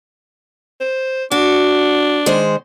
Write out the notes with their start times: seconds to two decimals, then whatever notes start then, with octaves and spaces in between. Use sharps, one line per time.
0.81 C5
1.31 D4 F#4
2.26 D#3 G#3 C5